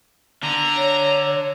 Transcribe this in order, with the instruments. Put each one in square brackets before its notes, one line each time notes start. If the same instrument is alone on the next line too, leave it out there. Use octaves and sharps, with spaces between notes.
[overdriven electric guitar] D3 [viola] A#5
[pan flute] C#5